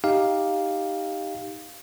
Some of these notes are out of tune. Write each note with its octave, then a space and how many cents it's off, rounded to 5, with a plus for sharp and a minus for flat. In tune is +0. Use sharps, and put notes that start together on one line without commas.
D#4 +0 G4 +0 F5 +0